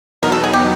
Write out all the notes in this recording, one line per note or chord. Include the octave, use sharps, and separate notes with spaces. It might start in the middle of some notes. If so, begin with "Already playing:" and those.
E2 B2 F#3 B3 D#4 A#4
A4
G#4
G4